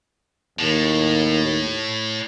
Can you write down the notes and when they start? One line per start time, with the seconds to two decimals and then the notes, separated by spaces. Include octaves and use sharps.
0.59 D#2 A2